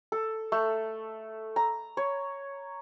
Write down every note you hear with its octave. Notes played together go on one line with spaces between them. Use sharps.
A4
A3
A#5
C#5